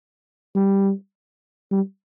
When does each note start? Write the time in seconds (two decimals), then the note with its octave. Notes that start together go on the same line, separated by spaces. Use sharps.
0.56 G3
1.72 G3